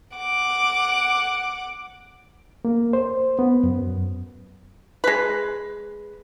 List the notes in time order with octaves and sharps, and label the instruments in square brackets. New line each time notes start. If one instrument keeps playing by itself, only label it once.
[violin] F#5 D6
[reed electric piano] A#3
C5
B3
F#2
[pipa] G#3 B4